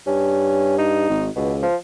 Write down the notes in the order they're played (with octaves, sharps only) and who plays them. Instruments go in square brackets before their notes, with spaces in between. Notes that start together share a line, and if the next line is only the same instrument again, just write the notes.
[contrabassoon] G2 [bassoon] C#4
[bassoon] D#4
[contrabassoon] G#1
[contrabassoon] C#2 [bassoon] B2
[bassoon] F3